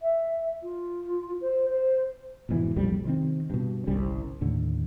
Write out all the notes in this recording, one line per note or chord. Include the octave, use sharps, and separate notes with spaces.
E5
F4
C5
C5
F1 G#2 B2 E3
B1 F2 A#2 G3
C3 D#3 C4
G2 B2
G1 C2 G3 C#4
D#2 A2 D3